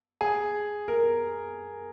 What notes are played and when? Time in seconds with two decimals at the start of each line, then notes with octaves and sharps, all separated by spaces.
0.21 G#4
0.88 A#4